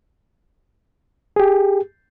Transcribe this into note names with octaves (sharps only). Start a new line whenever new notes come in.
G4 G#4